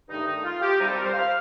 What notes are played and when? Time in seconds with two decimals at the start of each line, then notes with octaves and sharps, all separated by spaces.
0.09 G2 D#3 A3 D#4
0.27 D#4
0.44 F4
0.61 G4
0.79 C3 G3 C4 D#4
0.88 A4
0.96 A#4
1.05 C5
1.14 F5